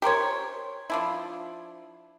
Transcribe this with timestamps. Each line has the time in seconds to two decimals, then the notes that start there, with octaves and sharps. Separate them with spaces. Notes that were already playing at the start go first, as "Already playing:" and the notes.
0.02 G4 A#4 C5 C#5
0.90 F3 D4 E4